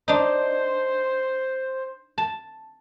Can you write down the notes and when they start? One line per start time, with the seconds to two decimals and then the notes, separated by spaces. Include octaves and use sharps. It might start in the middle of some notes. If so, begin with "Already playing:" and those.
0.08 D4 D#4 C5
2.18 A5